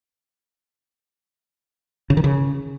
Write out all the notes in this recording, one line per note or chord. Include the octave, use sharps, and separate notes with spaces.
C#3
D#3
C#3